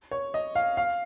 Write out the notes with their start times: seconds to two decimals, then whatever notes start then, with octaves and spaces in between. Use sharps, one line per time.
0.11 C#5
0.34 D#5
0.55 F5
0.77 F5